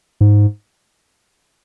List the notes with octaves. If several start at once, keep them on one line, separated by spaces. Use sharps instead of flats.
G#2